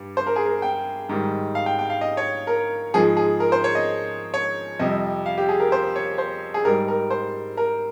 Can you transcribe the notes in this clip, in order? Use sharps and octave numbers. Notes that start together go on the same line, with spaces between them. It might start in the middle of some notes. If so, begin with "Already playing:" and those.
Already playing: G2 G3
C5
A#4
G#4
A#4
G5
G#2 D#3 G3
F5
G5
G5
F5
D#5
C#5
A#4
G#2 F3 G#4
G#4
A#4
C5
C#5
D#5
C#5
F2 C3 G3 D#5
F5
G4
G#4
A#4
C5
C#5
C5
G#4
G#2 G3 A#4
A#4
C5
A#4